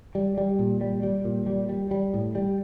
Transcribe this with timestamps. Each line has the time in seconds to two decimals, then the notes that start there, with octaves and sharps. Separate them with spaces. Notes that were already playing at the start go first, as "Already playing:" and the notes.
0.15 G3
0.38 G3
0.59 A#2
0.81 G3
1.03 G3
1.25 A#2
1.46 G3
1.69 G3
1.91 G3
2.14 A2
2.35 G3